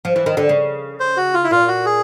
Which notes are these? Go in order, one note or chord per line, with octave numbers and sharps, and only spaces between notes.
F3
E3
D#3
D3
C#3
C5
F#4
F4
E4
A#2 F4
F#4
G#4